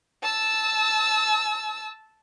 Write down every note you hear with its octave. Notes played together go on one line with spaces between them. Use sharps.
A5 E6